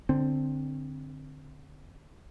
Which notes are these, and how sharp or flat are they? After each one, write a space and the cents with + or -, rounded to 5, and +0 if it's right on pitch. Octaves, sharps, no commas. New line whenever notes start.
D3 +0 C4 +5